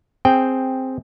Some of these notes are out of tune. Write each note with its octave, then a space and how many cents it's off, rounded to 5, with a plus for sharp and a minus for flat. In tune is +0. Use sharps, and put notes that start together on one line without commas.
C4 +0 G#4 +0 G5 +0